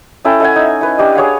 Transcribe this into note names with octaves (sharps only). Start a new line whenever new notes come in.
C#4 E4 A4 G5
A4 E5 F#5 G#5
D#4
E4 B4
D4 G4 D#5
G#4 C#5 F5 F#5